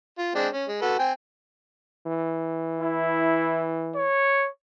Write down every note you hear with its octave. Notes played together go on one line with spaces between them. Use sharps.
F4
G#3 C4 D4
C#4
G#3
F#4 A4 B4
C4 G5 G#5
E3
E4
C#5